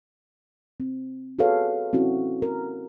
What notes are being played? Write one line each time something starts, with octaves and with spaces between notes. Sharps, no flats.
C4
F#4 G#4 A4 B4 C#5 F5
C4 C#4 E4 F#4
A#4